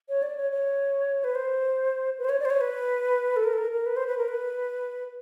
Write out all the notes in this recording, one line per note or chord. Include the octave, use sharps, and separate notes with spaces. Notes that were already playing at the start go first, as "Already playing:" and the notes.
C#5
D5
C#5
C#5
B4
C5
B4
C5
C#5
D5
C5
C#5
B4
A4
A#4
A4
A#4
A#4
B4
C5
B4
A#4
B4